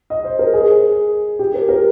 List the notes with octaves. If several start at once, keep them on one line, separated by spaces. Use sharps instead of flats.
D#5
C5
A#4
G#4
G4
A#4
A#4